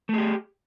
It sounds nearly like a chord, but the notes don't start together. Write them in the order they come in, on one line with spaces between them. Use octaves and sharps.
A3 G#4 G4